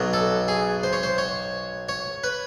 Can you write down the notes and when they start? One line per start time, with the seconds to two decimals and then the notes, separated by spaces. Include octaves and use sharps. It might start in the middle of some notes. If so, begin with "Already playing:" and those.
Already playing: B1 B2 F#3
0.13 A4
0.48 G#4
0.83 C5
0.93 C#5
1.03 C5
1.18 C#5
1.89 C#5
2.24 B4